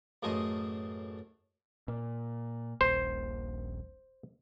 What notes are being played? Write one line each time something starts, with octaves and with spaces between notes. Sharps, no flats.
A1 F#2 A3 G#4 D#5 C6
A#2
D#1 A#1 C5